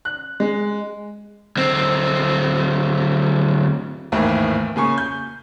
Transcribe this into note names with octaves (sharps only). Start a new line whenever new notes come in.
F#6
G#3
D2 C4
G#1 D#2 A2 E3
A#2 C#3 G#5 C#6
G6